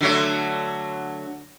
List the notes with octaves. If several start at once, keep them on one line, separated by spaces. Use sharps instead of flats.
D3 F#3 A3